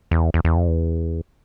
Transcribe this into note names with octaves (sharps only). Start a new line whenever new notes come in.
E2
E2
E2
F2
E2